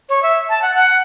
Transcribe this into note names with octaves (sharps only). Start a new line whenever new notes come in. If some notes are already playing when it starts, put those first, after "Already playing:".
C#5
E5
A5
F#5
F#5